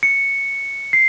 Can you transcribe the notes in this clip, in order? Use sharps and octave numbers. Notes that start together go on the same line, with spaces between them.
C#7
C7